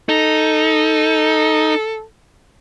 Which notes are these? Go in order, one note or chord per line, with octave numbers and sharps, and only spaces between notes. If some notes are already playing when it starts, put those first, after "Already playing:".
D#4 A4